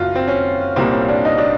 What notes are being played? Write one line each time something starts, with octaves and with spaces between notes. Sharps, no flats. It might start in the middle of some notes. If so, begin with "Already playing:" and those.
Already playing: F#1 F4 F#4
C4
C#4
C2 A#2 G3 A#3 C4
C#4
D4
D#4
D4